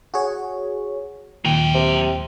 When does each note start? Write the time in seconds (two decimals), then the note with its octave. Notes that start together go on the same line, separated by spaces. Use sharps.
0.14 F#4 G#4 C#5
1.45 D#2 A#2 F#3 G5
1.74 C3